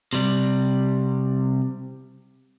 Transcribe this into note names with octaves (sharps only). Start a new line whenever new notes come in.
C3 G3